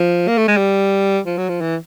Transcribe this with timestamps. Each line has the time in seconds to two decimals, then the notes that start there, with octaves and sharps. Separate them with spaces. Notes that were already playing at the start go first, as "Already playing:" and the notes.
Already playing: F3
0.28 A#3
0.38 A3
0.48 G#3
0.57 G3
1.26 F3
1.38 F#3
1.49 F3
1.61 E3